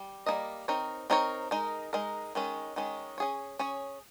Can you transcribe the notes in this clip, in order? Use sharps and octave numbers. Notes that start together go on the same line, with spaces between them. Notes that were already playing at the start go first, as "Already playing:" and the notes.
Already playing: G3
G3 A#3 D#4 A#4 D#5
C4 D#4 A#4 C#5
C4 D#4 A#4 C#5
G#3 D#4 A#4
G#3 D#4 A#4
D#3 G#3 C#4
D#3 G#3 C#4
C#4 G#4 C#5
C#4 G#4 C#5